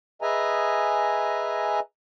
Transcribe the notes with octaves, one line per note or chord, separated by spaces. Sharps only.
G#4 B4 D#5 E5 G#5 A#5